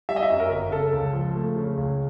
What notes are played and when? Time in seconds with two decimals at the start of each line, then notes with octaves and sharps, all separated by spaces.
0.09 G3 E5
0.16 D#5
0.23 E5
0.30 F#2
0.39 A#4
0.50 G1
0.71 C#3 A4
0.93 C#2
1.13 F3
1.35 A3
1.56 C#3
1.77 C#2